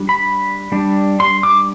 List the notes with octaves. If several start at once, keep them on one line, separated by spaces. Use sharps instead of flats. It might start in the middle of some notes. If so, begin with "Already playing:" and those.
Already playing: G3 D4
B5
G3 D4
C6
D6